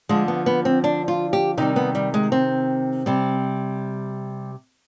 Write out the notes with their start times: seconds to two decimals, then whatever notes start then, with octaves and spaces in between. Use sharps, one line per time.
0.09 D3 F3 G#3
0.28 B3
0.46 B3
0.65 C4
0.84 D4
1.08 F4
1.33 G4
1.57 C3 D#3 G3 D#4
1.76 B3
1.95 G3
2.14 G#3
2.32 C4
3.06 C3 G3